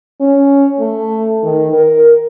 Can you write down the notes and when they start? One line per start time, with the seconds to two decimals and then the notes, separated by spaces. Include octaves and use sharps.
0.20 C#4
0.79 A3
1.43 D#3
1.73 A#4